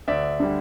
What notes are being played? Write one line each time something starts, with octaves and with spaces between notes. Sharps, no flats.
D2 D5 E5
D3 G3